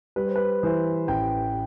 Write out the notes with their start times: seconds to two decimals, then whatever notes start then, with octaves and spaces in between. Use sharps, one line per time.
0.16 G3 B4
0.27 C5
0.36 B4
0.63 E3 C5
1.08 A1 G5